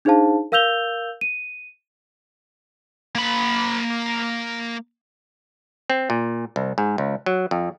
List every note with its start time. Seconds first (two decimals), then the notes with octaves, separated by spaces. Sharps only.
0.05 D4 D#4 G#4 C5 F5 A5
0.52 A#4 F5 E6 G6 F7 G7
1.21 D#7
3.15 A#3 B5
5.90 C4
6.10 A#2
6.56 C2
6.78 G#2
6.98 C#2
7.26 F#3
7.51 F2